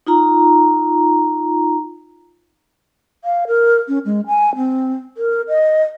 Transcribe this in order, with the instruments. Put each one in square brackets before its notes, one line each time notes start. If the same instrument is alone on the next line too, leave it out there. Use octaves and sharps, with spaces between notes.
[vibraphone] D#4 F4 A#5
[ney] F5
A#4
C#4
G#3
G#5
C4
A#4
D#5